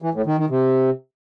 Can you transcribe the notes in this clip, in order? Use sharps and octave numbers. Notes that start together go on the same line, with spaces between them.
E3
A2
D#3
D#3
C3